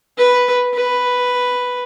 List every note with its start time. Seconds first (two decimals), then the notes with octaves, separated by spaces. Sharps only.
0.18 B4
0.74 B4